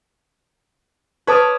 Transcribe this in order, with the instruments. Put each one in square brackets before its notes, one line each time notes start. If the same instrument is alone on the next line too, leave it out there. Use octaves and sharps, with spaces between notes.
[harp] B4 D6 F6 [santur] C#5 A5 D#6